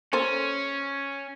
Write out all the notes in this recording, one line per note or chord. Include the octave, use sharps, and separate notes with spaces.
A#3 C#4 A4 C5